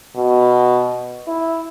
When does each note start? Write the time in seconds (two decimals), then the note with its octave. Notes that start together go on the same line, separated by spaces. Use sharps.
0.16 B2
1.28 E4